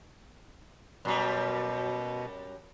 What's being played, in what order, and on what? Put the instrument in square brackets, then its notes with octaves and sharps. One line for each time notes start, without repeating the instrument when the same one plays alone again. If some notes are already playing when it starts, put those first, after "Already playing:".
[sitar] F#2 G3 [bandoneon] B2